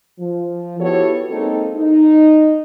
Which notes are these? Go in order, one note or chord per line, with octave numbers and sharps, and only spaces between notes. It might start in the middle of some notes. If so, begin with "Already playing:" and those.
F3
B3 E4 F#4 G4 A4 C#5
G#3 A#3 C4 D#4 A4
D#4